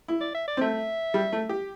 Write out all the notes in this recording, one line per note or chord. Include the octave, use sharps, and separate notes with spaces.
E4
D5
E5
D5
C4
A3 E5
G3
A3
G4